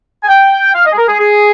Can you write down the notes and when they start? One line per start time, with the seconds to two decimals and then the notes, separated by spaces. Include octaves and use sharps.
0.23 G#5
0.29 G5
0.74 F5
0.86 D#5
0.93 G#4
0.98 A#4
1.09 G#4
1.20 G#4